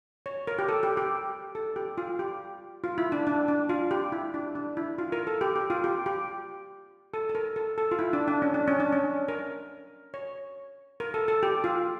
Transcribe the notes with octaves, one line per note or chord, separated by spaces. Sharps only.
C#5
A#4
G4
A4
G4
G4
A4
G4
F4
G4
F4
E4
D4
D4
D4
F4
G4
E4
D4
D4
E4
F4
A#4
A4
G4
G4
F4
G4
G4
A4
A4
A#4
A4
A4
F4
E4
D4
D4
C#4
D4
C#4
D4
C#4
A#4
C#5
A#4
A4
A4
G4
F4